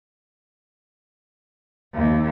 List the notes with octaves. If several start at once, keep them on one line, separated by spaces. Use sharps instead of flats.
D#2